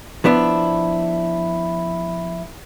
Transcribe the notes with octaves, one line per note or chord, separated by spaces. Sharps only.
F3 B3 D4 E4